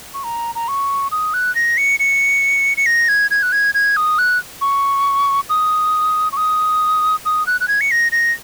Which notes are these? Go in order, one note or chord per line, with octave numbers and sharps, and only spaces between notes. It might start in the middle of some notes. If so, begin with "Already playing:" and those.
C#6
A#5
A#5
C#6
D#6
F#6
A#6
C#7
C#7
C#7
A#6
G#6
G#6
F#6
G#6
G#6
D#6
F#6
C#6
D#6
C#6
D#6
D#6
F#6
F#6
G#6
C#7
A#6
A#6